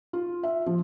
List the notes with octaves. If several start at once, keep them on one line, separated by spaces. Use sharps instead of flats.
F4
E5
F3